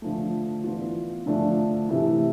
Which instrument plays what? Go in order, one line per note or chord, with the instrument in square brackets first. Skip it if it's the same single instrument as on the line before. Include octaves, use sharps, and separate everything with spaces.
[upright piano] D3 F3 A3
E3 B3 D4 F4
D3 F3 A3 D4
C3 E3 A3 E4